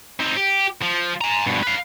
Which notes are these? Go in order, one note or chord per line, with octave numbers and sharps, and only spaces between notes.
C4 D#4
G4
F3
G#5 A#5
G2 B2
B4 F5